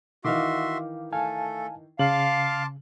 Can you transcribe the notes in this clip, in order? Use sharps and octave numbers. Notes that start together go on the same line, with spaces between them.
D#3 E3 D#4 F#4 E5 F5 C6 D6
A3 A4 F5 G#5 A5
C#3 F5 A5 C6 D6 F#7